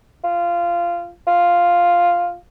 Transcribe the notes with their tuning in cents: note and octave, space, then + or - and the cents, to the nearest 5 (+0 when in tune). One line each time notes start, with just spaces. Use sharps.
F4 -15
F4 +0